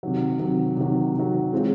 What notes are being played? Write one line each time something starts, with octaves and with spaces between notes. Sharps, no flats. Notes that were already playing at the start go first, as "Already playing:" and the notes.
C3 D#3 F#3
C3 D#3 F#3
C3 D#3 F#3
C3 D#3 F#3
E3 G#3 C4 F4